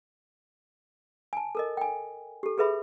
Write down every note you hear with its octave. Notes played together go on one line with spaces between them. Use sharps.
G#5 A5
A4 A#4 D#5
G5 G#5
G4 A4
G#4 A4 B4 E5 B5